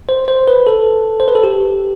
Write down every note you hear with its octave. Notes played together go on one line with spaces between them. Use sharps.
C5
C5
B4
A4
C5
B4
A4
G4